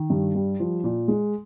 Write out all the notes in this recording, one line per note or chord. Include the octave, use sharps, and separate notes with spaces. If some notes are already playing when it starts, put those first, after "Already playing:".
Already playing: D#3
G2
G3
F3
A#2
G#3